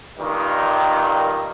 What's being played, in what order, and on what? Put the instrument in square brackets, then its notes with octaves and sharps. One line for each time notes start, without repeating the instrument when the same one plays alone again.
[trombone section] G2 A#2 D#3